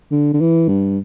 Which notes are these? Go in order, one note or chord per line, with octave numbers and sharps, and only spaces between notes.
D3
D3
E3
G2